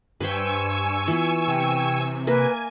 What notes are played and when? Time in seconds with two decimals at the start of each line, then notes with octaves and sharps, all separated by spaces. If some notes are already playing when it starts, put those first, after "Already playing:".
0.20 G2 B4 C5 G5 G#5 C#6 E6
1.07 E3 B3 F4
1.48 C3 G5
2.27 A#3 A#4 B4 E5 G#5